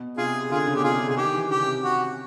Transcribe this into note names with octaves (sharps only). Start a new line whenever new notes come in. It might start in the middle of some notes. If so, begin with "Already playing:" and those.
Already playing: B2
C3 F4 G#4
D3 F4 G#4
C#3
B2 G4
C3 F4 G#4
C3
G#4
D#3 G4
E3
C#3 G4
C3
F#4